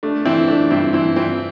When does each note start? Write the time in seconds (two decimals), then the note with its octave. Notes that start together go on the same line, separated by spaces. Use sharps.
0.03 A3 D4
0.25 E3 C4 E4
0.48 A3 D4
0.71 G2 C4 E4
0.93 E3 C4 E4
1.16 E3 C4